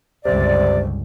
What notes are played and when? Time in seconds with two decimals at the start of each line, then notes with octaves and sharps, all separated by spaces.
0.25 G1 C#2 C3 D5